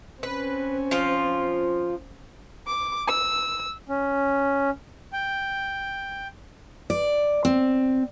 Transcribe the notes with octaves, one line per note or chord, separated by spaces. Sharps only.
C4 C#4 B4
F3 F4
D6
E6
C#4
G5
D5
C4